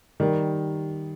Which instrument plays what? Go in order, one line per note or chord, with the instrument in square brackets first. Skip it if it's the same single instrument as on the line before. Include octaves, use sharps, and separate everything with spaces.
[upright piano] D#3 G3